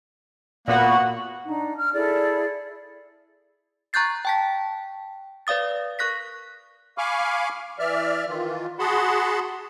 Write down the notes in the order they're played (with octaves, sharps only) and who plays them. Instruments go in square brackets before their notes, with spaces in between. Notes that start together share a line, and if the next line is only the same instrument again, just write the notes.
[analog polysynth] A#2 B3 F#4 [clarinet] A#3 [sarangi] F#5
[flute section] D4 D#4
F6
E4 G#4 A4 D5
[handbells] A#5 C#6 F#6 G6 A6 C7
G5 A5 B6
B4 D5 F5 D#6 A6
A#4 C#6 F#6 A#6 B6
[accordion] F5 G#5 B5 C#6 D6 F6
E3 D5 E5 F6
D#3 E3 F4
F#4 G#4 F#5 A5 B5 C6